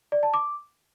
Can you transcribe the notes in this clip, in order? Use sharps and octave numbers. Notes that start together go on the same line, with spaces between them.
D5
A5
D6